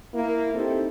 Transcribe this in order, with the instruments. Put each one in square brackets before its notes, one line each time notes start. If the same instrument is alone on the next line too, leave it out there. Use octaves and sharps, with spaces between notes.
[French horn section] A#3 E4
C4 D#4 E4 G4 A4